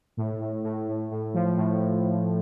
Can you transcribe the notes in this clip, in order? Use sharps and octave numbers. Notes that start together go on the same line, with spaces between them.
A2
A2
A2
A2
A2
F3
A2